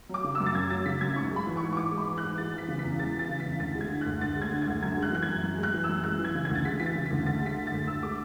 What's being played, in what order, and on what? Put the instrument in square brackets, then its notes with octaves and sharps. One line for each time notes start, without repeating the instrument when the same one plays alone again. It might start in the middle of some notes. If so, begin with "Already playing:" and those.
[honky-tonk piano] F#3 D6
C#3
E6
F#2
A6
F#2 G#6
F#3 A6
C#3 B6
F#2 G#6
G#2 C#6
G#3 B5
E3
C#6
G#2
C#6
G#2 D6
G#3
B5
E3
F#6
G#2
G#3 A6
E3 B6
C#3
B6
E2
G#3 A6
E3
A6
C#3
B6
E2
D2 A6
G#3
G#6
D3
F#6
D2
D2 A6
G#3
G#6
D3
G#6
D2
F#2 G#6
G#3 F#6
E3 F#6
G#6
F#2
F#2
G#3 F#6
E3
E6
F#2
G#3 F#6
E3
G#6
C#3
G#6
D2
A6
G#3 B6
E3 B6
A6
C#3
B6
D2
D2 A6
G#3 B6
D3
A6
D2
D2 E6
G#3 D6